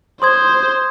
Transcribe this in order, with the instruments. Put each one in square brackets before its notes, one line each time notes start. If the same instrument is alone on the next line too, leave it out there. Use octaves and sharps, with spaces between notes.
[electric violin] C5 [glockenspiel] C6 D#6 G#6